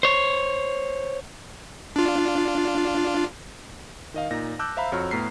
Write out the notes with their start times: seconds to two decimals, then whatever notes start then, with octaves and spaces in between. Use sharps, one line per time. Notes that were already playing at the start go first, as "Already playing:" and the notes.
0.03 C5 C#5
1.96 D4 F4
4.14 D#3 D#5 F5
4.31 A#2 D#4 A#6
4.59 A5 D6 E6 F#6 G6
4.77 C5 E5 F5 A#5 B5
4.92 F2 F#4 C#5 A#5 F6
5.11 A2 B3 A#5 B6 C7